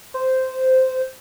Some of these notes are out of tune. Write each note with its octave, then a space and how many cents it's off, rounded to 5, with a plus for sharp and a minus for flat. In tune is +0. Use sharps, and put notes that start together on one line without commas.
C5 -10